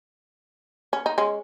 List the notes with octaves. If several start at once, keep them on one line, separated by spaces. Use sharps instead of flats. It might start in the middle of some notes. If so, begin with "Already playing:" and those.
C#4
D#4
G#3 C#4